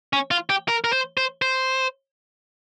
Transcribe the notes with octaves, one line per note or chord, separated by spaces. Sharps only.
C#4
F4
G4
A#4
A#4
C5
C5
C5